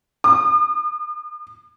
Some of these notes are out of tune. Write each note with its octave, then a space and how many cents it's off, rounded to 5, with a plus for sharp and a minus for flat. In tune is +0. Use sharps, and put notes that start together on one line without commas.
D#6 -45